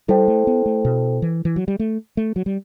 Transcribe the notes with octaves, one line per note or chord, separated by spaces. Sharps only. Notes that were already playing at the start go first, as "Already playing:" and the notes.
G3 E4 A4 C5 G5
A3
B3
A3
B2
E3
E3
F#3
G3
A3
A3
F#3
G3